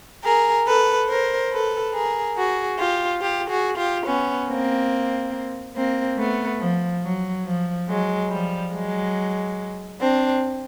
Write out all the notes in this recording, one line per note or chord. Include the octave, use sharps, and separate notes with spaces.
G#4 A#4
A4 B4
A#4 C5
A4 B4
G#4 A#4
F#4 G#4
F4 G4
F4 G4
F#4 G#4
F4 G4
B3 C#4
A#3 C4
A#3 C4
A3 B3
F3
F#3
F3
F#3 G#3
F3 G3
F#3 G#3
C4 D4